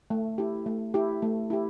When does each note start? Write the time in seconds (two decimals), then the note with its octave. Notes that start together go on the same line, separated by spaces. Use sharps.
0.10 A3
0.38 E4 G4
0.66 A3
0.94 E4 G4
1.22 A3
1.50 E4 G4